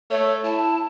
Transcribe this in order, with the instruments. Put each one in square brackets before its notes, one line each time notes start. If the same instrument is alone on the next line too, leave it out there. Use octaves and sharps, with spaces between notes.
[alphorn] A3 [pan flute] C#5
[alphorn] E4 [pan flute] A5